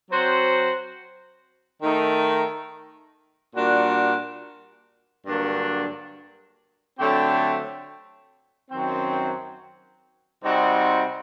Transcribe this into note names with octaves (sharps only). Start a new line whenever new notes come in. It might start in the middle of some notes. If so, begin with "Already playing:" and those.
F#3 C4 F#4 C5
D#3 A3 D#4
A#2 G3 D4 F#4
G2 D3 F#3 A#3 D4
D3 F#3 A3 C4 G4
F#2 D#3 F#3 C4
C3 G3 C4 D#4 F#4